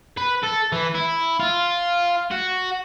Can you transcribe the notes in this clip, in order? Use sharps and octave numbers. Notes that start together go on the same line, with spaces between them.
B4
A4
E3
E4
F4
F#4